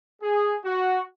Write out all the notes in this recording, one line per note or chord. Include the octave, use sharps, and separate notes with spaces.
G#4
F#4